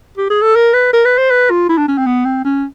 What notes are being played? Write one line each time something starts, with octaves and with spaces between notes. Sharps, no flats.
G4
G#4
A4
A#4
B4
A#4
B4
C5
B4
F4
E4
D4
C#4
C4
B3
C4
C#4